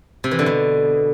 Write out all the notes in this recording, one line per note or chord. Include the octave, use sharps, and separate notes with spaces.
C3
E3
D3
B2